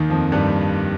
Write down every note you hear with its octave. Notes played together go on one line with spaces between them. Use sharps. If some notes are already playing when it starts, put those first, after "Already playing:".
Already playing: D#2 D#3
F2 F3
G2 G3